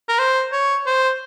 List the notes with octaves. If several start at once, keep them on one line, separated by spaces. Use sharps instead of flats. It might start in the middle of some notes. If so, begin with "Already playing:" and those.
A#4
C5
C#5
C5